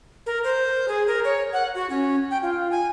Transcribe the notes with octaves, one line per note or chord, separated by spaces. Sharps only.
A#4
C5
G#4
A#4
C#5
F#5
F#4
C#4
G5
F4
G#5